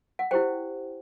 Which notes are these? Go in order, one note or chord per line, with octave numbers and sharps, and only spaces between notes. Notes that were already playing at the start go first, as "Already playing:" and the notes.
F#5
E4 G4 C5 G5